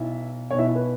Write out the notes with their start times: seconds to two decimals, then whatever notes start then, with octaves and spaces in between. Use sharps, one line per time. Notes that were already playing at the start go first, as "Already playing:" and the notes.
Already playing: B1 B2 E4 E5
0.50 B1 C#5
0.54 B2 E4 E5
0.67 E4 E5
0.75 B4